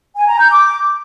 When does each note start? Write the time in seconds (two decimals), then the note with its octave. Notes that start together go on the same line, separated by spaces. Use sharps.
0.16 G#5
0.28 A#5
0.39 G6
0.51 D6